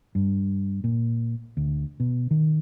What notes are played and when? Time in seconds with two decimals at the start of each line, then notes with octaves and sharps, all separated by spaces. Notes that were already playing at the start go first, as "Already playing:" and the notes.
0.15 G2
0.84 A#2
1.57 D2
2.00 B2
2.31 D#3